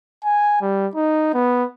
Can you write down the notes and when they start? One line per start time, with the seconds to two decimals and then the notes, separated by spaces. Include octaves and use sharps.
0.24 G#5
0.61 G3
0.95 D#4
1.34 B3